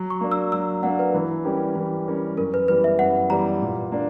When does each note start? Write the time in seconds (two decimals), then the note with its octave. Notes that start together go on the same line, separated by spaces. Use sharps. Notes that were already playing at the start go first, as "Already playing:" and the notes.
Already playing: F#3
0.10 C#6
0.21 A#3 D4
0.32 E6
0.52 F#3 E6
0.83 A#3 D4 F#5
0.99 B4
1.14 E3
1.44 G3 C#4 G4 A#4
1.75 E3
2.07 G3 C#4 G4 A#4
2.37 F#2 A#4
2.54 B4
2.68 E3 G3 B3 B4
2.84 E5
2.99 F#2 F#5
3.30 E3 G3 B3 A#5
3.62 A#2
3.92 A#3 D4